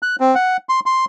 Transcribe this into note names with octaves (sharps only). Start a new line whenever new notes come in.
F#6
C4
F#5
C6
C6